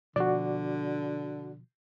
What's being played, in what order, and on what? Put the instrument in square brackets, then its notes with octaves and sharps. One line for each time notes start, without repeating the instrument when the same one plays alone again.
[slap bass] B2 F3 [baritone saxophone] D3 [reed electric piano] F#4 D5